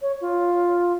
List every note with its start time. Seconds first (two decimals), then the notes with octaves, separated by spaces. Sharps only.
0.02 C#5
0.21 F4